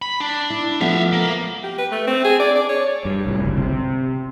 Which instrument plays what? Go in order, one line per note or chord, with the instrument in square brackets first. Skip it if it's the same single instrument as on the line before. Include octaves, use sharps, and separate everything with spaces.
[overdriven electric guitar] B5
D4
[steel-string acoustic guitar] E4
[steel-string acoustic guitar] F3 A3 B3 [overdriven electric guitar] E5 F5
[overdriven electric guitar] A#3
[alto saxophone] G4
B4
A3
C4
G#4
D5
D5
C#5
[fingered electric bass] G2
C2 A2
G1 C#2
C3